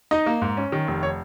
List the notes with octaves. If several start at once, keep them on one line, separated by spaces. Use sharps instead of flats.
D#4 D#5
A#3
G#2
C#4
D#3
F1
C#5